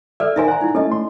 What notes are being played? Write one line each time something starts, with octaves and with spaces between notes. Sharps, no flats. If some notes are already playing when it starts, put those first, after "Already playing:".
A4 D5 E5 F6
D#4 A#4 C5 E5 F5 G#5
F#5 A#5
D#4 E4
A3 C#4 A4 D#5
C6